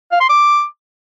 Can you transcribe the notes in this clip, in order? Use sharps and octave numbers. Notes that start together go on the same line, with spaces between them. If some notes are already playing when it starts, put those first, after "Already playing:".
F5
C6
D6